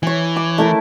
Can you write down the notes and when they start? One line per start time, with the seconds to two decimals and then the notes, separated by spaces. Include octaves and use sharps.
0.03 E3 C#5 G#5
0.36 D6
0.58 A3 E4 A#4